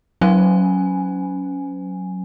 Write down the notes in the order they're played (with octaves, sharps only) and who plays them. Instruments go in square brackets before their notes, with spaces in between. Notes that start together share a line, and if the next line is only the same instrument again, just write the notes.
[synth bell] F#3 C#4 G#5